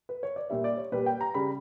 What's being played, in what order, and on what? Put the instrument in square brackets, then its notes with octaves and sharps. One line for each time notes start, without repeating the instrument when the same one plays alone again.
[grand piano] B4
C#5
D5
A#2 G3 E5
D5
C#5
A#2 G3 B4
G5
A#5
C#3 G3 B5